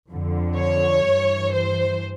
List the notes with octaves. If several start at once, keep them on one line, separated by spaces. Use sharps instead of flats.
F2 D3
C#5
G2 E3
C5